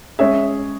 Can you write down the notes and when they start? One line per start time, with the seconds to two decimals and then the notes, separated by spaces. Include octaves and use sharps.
0.19 G#3 C#4 G#4 C#5 E5